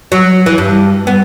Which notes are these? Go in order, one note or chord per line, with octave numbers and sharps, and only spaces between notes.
F#3
E3
G2
B3